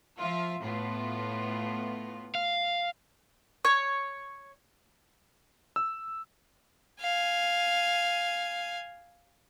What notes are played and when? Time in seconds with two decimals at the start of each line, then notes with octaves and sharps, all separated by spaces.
0.17 F3 F4 E5
0.61 A2 B3 F4
2.35 F5
3.65 C#5
5.76 E6
7.01 F5 G#5